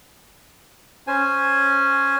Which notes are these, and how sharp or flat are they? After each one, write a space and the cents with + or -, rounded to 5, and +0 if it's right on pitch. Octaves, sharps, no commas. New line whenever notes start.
C#4 +0 C5 +5 G#5 +0